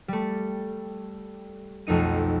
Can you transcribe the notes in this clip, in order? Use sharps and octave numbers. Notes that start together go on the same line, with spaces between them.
G3 A3
B1 F2 A3 D#4 D#7